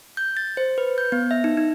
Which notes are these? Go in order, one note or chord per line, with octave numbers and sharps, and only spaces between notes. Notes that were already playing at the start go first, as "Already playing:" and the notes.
G6
A6
C5
B4
G6
B3
E5
D#4
D#4